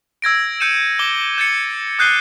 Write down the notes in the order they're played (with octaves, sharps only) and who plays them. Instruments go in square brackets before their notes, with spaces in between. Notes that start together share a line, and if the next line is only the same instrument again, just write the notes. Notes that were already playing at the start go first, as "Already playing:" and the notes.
[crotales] E6 G#6 A#6 D7
E6 G6 C#7 D#7 E7
D6 G7
G6 A6 C#7
D#6 F#6 G6 C7 D#7 G7